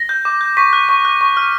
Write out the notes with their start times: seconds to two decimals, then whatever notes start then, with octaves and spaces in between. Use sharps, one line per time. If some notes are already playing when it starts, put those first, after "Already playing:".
Already playing: A#6
0.09 G6
0.25 D6
0.41 G6
0.57 C#6 B6
0.73 F#6
0.89 C#6
1.05 F#6
1.21 C#6
1.37 F6